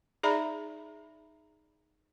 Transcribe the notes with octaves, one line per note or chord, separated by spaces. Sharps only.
D#4 G#4 D5 E5 A#5 B5